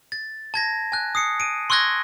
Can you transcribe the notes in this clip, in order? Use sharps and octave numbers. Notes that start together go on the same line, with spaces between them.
A6
A5 G#6 A#6
G#5 F#6
D#6 C7 C#7
D7 D#7
C6 C#6 E6 F#6 G#6 A#6